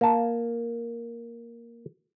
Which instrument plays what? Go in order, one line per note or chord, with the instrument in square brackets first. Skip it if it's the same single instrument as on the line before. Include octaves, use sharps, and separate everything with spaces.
[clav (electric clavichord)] A#3 A5